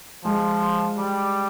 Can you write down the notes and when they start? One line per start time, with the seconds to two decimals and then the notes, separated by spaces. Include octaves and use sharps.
0.24 F3 G#3
0.97 G3